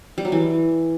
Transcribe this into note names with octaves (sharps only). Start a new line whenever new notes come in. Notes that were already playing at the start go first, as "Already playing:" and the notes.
G3
F#3
E3